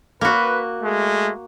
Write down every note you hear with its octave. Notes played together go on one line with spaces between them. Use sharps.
A#3 F#4 B4
G#3 A3